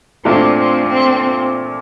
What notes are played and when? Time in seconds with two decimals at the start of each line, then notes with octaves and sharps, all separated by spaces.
0.24 A#2 A3 C4 D4 F4
0.56 C4
0.87 C4